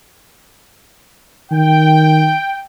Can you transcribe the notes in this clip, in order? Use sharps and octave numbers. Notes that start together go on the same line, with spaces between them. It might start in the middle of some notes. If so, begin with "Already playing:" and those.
D#3 G5